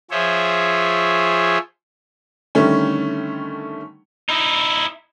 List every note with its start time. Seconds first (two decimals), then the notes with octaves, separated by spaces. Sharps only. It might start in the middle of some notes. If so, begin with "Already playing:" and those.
0.11 F3 G#4 C5 C#5 E5
2.55 D3 D#3 G3 A3 C#4
4.29 D#4 E4